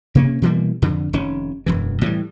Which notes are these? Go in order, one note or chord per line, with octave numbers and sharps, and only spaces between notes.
C3 A#3 C#4
B2 E3 G3 A#3
F2 D3
F1 D#3 C#4
E1 F#2 E3
A2 E3 F3 G3